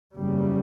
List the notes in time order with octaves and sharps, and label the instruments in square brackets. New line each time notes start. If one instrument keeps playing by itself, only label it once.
[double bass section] F#1 E2 C#3 G3